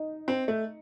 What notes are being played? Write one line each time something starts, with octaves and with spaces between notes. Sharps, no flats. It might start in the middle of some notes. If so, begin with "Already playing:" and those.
Already playing: D#4
C4
A3